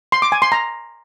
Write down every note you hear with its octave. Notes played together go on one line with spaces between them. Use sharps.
C6
D6
G#5
C6
A#5